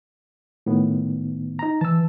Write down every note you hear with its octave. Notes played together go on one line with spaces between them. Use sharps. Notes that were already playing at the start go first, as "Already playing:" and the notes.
A2 D#3 B3
D#4 A#5
E3 A5 E6